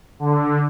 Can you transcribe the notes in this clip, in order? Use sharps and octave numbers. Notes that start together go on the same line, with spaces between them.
D3